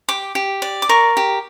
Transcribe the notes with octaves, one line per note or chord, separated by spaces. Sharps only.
G4 D6
G4
D5
D6
A#4 C#6
G4